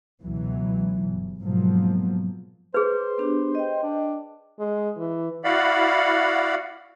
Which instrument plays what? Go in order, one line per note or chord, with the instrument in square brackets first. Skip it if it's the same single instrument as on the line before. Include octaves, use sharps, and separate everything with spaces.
[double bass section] C#2 B2 E3 F#3
G1
G#2 B2 F3 F#3 A#3
[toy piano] G#4 B4 [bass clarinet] C5
[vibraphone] B3 D4 G4
D#5 G5
[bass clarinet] D4
[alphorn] G#3
E3
[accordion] E4 F#4 D5 F5 F#5 B5